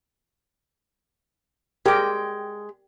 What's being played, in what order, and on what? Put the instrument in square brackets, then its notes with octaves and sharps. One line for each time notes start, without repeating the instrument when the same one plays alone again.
[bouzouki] G#3 G5 [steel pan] G4 A#4